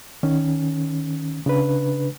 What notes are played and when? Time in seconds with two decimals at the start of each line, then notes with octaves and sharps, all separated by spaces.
0.23 D#3 C#4
1.46 C#3 D4 B4